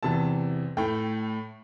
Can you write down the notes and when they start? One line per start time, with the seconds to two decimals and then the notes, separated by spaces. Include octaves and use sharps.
0.03 E2 C3 E3 A5
0.77 A2 A3 G5